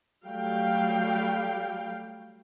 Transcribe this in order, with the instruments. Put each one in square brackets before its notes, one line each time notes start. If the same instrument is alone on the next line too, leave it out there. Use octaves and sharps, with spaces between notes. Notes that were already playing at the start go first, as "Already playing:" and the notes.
[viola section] F#3 G3 A3 F5 G5